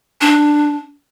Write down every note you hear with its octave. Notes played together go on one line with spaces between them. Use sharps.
D4